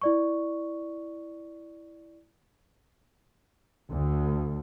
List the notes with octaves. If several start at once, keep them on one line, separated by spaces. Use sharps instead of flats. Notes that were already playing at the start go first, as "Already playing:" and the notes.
E4 D5 C#6
D2